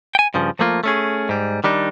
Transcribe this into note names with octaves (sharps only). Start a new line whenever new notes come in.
G5 G#5
G2 C#3 F3
F3 A3 A#3 F4
A3 C#4 G#4
G#2 G3
D#3 G3 D4 D#4